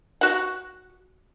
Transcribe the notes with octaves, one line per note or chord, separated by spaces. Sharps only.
F#4 F#5